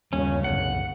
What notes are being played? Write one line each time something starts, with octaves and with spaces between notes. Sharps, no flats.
G1 D#2 C#3 G3 C#4
C2 F#2 F#5